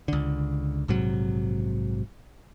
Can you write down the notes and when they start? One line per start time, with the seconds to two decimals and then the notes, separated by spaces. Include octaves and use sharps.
0.08 C#2 D3
0.88 A#1 G#2 C3 F#3